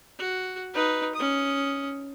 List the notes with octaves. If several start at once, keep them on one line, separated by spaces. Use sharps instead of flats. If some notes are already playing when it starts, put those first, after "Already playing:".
F#4
D#4 B4
C#4 D#6